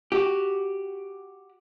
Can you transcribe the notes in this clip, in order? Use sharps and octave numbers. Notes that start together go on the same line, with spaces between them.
F#4 G4